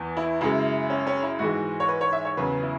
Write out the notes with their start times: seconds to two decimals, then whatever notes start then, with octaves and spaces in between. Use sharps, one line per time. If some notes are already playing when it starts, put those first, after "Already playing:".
Already playing: E2 E3
0.17 E4
0.41 F#2 C#3 G#3 E4
0.90 C#4
1.07 C#4
1.23 E4
1.39 G#2 E3 G#3 F#4
1.80 C#5
1.88 B4
2.01 C#5
2.13 E5
2.25 C#5
2.37 E2 C#3 F#3 B4
2.63 E4